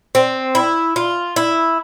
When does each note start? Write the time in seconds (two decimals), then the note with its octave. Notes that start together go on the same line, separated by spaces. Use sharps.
0.15 C4
0.55 E4
0.96 F4
1.36 E4